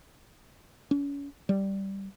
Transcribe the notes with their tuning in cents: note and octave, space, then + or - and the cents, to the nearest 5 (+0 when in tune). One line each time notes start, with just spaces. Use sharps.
C#4 +35
G3 -5